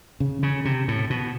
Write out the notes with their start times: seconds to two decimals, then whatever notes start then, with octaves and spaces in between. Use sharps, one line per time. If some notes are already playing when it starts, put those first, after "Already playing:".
0.20 C#3
0.43 C#3
0.65 C3
0.88 A2
1.10 B2